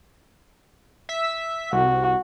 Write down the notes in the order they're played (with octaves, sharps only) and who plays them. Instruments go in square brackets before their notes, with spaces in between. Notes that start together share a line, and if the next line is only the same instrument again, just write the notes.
[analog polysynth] E5 B6
[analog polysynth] C2 [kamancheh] F#4